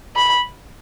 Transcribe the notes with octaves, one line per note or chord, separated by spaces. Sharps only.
B5